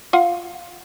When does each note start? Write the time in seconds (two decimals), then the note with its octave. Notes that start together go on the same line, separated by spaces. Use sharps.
0.13 F4 F5 F#5